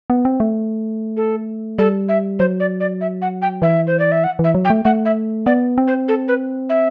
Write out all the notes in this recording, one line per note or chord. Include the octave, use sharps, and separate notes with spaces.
B3
C4
A3
A4
G3 A4
E5
F#3 C5
D5
D5
E5
F#5
G5
E3 E5
C5
D5
E5
F#5
E3
E5
F#3
G5
A3
A3 F#5
E5
B3 D5
C4
C5
A4
B4
E5